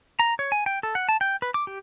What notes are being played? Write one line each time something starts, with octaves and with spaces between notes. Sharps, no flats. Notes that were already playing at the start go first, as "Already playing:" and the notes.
A#5
C#5
G#5
G5
A4
F#5
A5
G5
B4
D6
G4